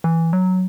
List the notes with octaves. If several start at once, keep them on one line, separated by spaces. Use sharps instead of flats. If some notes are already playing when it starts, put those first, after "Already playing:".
E3
F#3